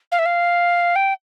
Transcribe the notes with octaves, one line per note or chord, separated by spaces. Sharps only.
F5
E5
F5
G5